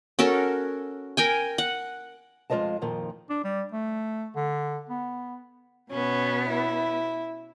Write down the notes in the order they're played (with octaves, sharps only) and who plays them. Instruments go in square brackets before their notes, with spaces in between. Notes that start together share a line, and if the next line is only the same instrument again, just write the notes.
[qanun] C#4 F#4 A4 A#4
A#4 G5 G#5
F#5
[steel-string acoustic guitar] F2 G#3 F4 C5 D#5 A5
F2 A#2 D#3 F3
[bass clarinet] D4
G3
A3
D3
B3
[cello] B2 B3 [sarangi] C#4
[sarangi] E4